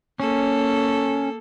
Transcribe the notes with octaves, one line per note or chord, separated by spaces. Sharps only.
A#3 C#4 A4